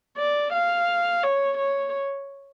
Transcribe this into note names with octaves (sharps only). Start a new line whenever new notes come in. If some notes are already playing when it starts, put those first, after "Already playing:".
D5
F5
C#5
C#5